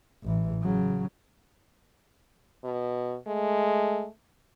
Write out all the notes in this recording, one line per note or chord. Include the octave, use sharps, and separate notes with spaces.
A1 E3
C#3 F#3
B2
G#3 A3